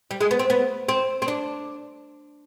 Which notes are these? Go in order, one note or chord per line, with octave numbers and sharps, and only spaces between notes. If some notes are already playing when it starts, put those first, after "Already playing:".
G3
G#3
B3
C4
B3
C4
C4
D4